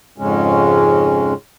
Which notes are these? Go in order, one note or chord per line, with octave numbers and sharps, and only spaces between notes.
F2 G#2 C#3 G#3 C#4